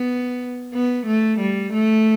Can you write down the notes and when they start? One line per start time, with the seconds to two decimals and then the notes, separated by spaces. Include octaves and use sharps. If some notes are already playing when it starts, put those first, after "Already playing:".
Already playing: B3
0.74 B3
1.06 A3
1.40 G3
1.73 A3